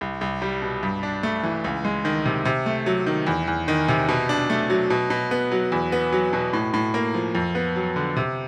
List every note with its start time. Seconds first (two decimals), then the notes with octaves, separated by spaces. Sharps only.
0.01 C2
0.21 C2
0.42 G3
0.62 B2
0.83 G2
1.03 D4
1.23 A3
1.43 E3
1.64 C#2
1.85 G#3
2.05 D#3
2.25 C3
2.45 C3
2.66 A3
2.86 F#3
3.06 D#3
3.27 E2
3.47 E2
3.68 D#3
3.88 C3
4.09 B2
4.29 D4
4.50 A3
4.70 F#3
4.90 B2
5.10 B2
5.31 B3
5.52 F#3
5.72 E2
5.92 B3
6.13 F#3
6.33 B2
6.53 A2
6.74 A2
6.94 A#3
7.14 F3
7.35 F2
7.55 B3
7.76 F#3
7.96 D3
8.16 C3